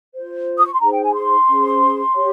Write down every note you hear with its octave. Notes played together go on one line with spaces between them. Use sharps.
F4 C5
D#6
C#6
C6
D#4 G#4 C5 A#5
G5
G#5
C6
C#4 G#4 C5
G4 C#5